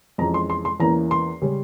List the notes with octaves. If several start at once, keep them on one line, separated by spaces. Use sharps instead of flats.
F2 E3 G#3 C#4 A#5
C6
C6
C6
E2 E3 A#3 C#4 A#5
C6
C#3 G3 C#4